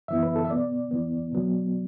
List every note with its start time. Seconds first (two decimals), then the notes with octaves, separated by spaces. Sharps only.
0.08 F#2 E3 B3 E5
0.23 B4
0.36 A4
0.45 E5
0.49 B2 B3 D5
0.91 E2 E3 B3
1.32 B2 F#3 B3